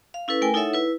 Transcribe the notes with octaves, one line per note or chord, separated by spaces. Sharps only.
F5
C#4 E4 A4 B4
A3 A#4 G5 G#5
D#4 E4 A4 C#5 E5 F#5
E4 B4